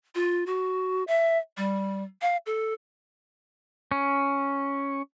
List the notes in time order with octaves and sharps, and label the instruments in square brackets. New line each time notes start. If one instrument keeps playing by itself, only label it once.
[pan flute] F4
F#4
E5
G3
F5
A4
[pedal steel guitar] C#4